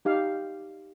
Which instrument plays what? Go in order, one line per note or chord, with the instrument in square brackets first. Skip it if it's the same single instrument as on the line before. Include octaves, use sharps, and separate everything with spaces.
[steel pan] D#4 G4 F5